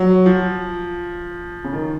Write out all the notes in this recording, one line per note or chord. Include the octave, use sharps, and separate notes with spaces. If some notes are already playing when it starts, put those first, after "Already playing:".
Already playing: F#3
F3
C#3
D#3